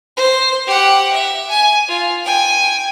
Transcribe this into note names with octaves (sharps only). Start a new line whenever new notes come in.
C5
G4 F#5
E5
G#5
F4
G5 G#5